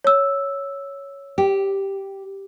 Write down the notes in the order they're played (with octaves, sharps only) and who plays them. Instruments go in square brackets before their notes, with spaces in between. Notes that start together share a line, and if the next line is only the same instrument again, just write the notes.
[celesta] C#5 E6
[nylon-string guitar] G4